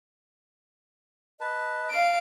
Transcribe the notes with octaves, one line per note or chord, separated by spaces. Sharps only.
B4 D#5 A5
F5 D7